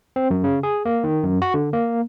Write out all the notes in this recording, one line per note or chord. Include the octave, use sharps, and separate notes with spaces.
C4
F#2
C#3
G#4
A#3
D#3
F#2
F#4
D3
A#3